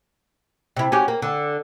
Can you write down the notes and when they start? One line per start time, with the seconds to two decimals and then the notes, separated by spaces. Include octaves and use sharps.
0.76 C3 E4
0.92 C#4 F#4 G4
1.08 A#3
1.22 D3